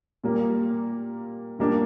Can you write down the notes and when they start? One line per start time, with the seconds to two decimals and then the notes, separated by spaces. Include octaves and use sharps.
0.23 A#2 G3 A#3
1.59 A#2 G3 A#3 D4